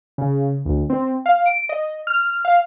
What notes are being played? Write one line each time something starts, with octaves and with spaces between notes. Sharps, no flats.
C#3
D2
C4
F5
D7
D#5
F6
F5